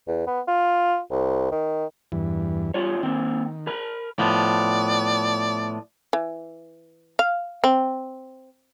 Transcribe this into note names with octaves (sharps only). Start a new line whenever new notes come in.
E2
B3
F4
C2
D#3
E2 G2 E3
E2 G3 F4 C#5
D#3 A#3 C4
A#4 B5
A2 F3 B3 D5
E3
F5
C4